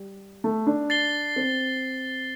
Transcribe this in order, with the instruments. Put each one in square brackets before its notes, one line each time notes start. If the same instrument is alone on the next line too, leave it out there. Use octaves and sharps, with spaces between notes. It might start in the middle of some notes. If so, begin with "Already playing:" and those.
Already playing: [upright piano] G3
A3
D4
[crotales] A6 C7 G7
[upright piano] C4